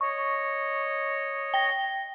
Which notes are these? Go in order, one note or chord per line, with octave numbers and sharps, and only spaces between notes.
C#5 D#5 C#6
G5 A#6